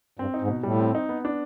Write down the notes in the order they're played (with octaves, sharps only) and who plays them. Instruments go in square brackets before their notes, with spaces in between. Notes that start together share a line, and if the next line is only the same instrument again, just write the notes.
[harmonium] G2 [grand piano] C4
[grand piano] D#4
[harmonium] G#2
[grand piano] B2
[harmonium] A2 [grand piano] G3
[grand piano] C4
D#4
B3
D4